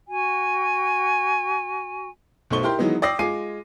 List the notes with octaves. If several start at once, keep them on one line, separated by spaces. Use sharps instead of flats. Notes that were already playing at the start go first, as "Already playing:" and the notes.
F#4 G#5
B1 B2 A3 C5 C#6 G7
E4 G4 A#4 G5 C6
D#3 E3 F#3 G#3 B3 D#4
D5 G5 D#6 E6 A#6 C7
G#3 F4 G#5 D6 C7 D#7